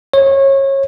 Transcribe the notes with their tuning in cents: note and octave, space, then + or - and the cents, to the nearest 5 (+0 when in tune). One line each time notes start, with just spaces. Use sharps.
C#5 -25